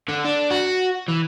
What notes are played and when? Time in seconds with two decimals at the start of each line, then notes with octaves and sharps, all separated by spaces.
0.08 D3
0.25 D4
0.51 F#4
1.08 E3